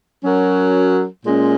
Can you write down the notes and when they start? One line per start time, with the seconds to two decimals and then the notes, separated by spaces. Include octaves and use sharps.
0.23 F#3 C#4 F#4 A#4
1.26 A#2 G#3 C#4